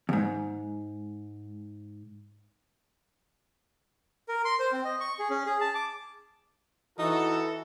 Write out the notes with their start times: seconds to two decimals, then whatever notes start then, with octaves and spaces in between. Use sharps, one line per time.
0.09 E2 G#2
4.29 A#4
4.45 C6
4.59 C5
4.73 C4
4.84 D#5
5.00 C#6
5.19 G#4
5.30 C#4
5.46 G#4
5.61 A5
5.75 D6
6.99 E3 D#4 F#4 A4